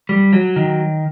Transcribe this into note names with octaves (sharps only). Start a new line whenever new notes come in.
G3
F#3
D#3